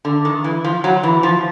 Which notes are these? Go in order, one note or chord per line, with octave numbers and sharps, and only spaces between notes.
D3
D#3
E3
F3
F#3
E3
F3